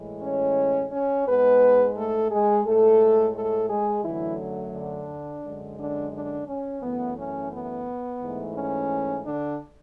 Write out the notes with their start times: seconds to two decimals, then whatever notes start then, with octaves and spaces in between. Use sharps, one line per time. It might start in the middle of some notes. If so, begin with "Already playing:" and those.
Already playing: A2 E3 G#3
0.22 C#4 C#5
0.92 C#4 C#5
1.26 G#2 G#3 B3 B4
1.96 A3 A4
2.30 G#3 G#4
2.65 A2 G#3 A3 A4
3.35 A3 A4
3.70 G#3 G#4
4.04 F#2 D3 E3 F#3 A3 E4
4.73 D3 D4
5.43 F#2 D3 G#3
5.78 D3 D4
6.12 D3 D4
6.48 C#4
6.82 F#2 E3 A3 B3
7.17 C#4
7.51 B3
8.20 G#2 E3 A3
8.55 C#4
9.24 D3 D4